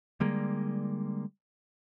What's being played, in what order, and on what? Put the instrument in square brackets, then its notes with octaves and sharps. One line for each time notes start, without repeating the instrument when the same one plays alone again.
[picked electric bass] D3 G3 G#3 A#3